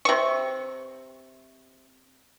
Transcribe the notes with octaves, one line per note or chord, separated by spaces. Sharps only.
C3 C#6